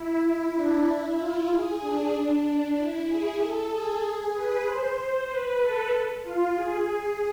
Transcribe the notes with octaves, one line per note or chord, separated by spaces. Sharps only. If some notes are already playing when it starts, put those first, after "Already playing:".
Already playing: E4
D4
E4
F4
G#4
D4
E4
G#4
A4
G#4
B4
C5
B4
A4
F4
G#4
G#4